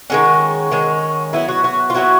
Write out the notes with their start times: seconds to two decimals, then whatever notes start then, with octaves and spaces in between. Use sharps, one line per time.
0.10 D#3 G#3 C#4 F#4
0.71 D#3 G#3 C#4
1.33 F#3 B3 E4
1.49 F#4
1.64 F#4
1.90 F4
1.95 F#3 B3 E4 F#4